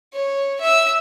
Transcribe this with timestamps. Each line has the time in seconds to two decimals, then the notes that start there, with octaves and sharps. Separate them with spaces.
0.14 C#5
0.61 E5 E6